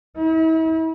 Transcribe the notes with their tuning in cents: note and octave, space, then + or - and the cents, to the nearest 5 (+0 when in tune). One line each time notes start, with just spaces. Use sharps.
E4 -40